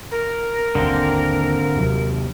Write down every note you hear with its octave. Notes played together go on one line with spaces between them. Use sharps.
A#4
G#1 D#2 D3 A#3 C4
D#2 C3 F#3